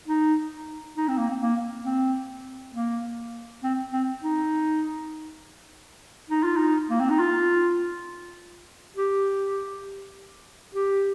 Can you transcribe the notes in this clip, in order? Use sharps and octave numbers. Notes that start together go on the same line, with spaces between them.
D#4
D#4
C4
A#3
C4
A#3
C4
A#3
C4
C4
D#4
D#4
F4
D#4
A#3
C4
D#4
F4
G4
G4